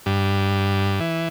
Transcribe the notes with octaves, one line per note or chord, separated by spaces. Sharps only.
G2
E3